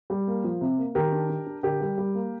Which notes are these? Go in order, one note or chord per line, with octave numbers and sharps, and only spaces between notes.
G3
A#3
F3
C3
A#3
D#3 G4 A#4
D4
D4
D4
D3 G4 A#4
G3
G3
A#3